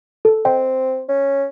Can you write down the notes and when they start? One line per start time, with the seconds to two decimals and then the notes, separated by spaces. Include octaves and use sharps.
0.25 A4
0.45 C4 D#5 G5
1.08 C#4